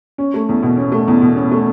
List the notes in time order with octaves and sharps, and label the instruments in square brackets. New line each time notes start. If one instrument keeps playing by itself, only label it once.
[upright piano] C#4
A3
E2
B2
C#4
A3
E2
B2
C#4
A3